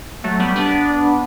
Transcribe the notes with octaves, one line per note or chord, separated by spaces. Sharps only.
F#3 A3
G3 B3
B3 D4